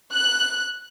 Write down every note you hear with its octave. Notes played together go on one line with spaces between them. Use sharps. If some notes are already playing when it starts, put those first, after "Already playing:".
F#6